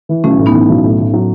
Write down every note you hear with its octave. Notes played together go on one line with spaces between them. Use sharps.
E3
B1 A3 C#4
A2
B3 D#4
E3
B1
A2
A2
F#3